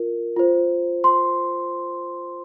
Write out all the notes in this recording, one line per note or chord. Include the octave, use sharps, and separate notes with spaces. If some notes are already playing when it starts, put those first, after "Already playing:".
Already playing: F4 A#4
F4 C5
C6